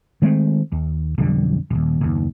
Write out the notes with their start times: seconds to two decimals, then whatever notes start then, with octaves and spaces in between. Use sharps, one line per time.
0.22 D#3 G#3 A3 C4
0.72 D#2
1.18 B1 F2 D3 G3
1.70 D#1 D#2
2.01 F#1 D#2